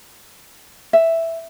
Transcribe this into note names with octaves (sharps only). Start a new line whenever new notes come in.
E5